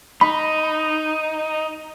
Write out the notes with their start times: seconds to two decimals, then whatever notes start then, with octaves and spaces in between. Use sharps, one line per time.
0.21 D#4 B5